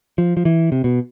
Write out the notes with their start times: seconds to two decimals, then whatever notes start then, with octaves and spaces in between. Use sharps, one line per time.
0.18 F3
0.37 F3
0.45 E3
0.72 C3
0.84 B2